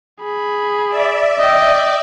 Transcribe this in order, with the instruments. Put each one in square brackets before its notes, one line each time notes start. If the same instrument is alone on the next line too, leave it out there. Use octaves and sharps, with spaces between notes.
[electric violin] G#4 B5
[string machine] D5 E5
[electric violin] D#5 G5